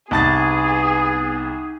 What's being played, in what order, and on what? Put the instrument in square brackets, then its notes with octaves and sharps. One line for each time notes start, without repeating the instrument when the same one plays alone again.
[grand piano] C2 A5 A6 [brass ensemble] B3 [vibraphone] D#4 F#5 [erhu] G#4